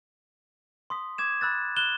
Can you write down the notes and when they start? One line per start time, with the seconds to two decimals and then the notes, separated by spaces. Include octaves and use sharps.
0.90 C6 D#6 B6
1.18 D6 G#6 E7
1.41 B5 E6 F#6 A6
1.76 F#6 E7 G7